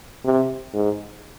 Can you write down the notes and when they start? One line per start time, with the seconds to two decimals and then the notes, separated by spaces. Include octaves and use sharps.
0.25 C3
0.74 G#2